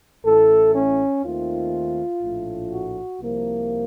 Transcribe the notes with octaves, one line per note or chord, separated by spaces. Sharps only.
A1 A2 A3 A4
C#4
D#2 D#3 A3 C4 F4
A#1 A2 A3
F#4
C2 C3 F3 A#3